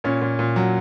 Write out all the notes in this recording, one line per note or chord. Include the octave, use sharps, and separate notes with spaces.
A#2 C#4
A#2
A#2
F#3